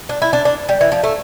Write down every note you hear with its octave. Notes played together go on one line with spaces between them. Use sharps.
D4
E4
D4
D4
G3
E3
F3
A3